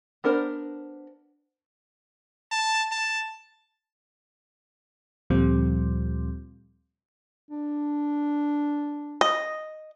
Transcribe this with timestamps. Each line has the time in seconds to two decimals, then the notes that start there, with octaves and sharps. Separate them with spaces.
0.24 B3 D4 A#4 C5
2.52 A5
2.92 A5
5.30 D2 A#2 F3 G3 C4
7.51 D4
9.21 D#5